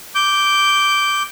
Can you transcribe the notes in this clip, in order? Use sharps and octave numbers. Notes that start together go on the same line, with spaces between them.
D6 G6